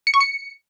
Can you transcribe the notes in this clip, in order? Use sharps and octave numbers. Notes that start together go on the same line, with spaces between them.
C#7
C#6
C#7